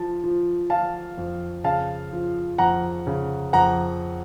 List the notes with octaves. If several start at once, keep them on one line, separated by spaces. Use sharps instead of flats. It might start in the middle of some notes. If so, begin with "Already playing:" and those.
Already playing: F3 A5
F3
F3 F5 A5
F2
C#3 F5 A5
F3
F2 F#5 A#5
C#3
F2 F#5 A#5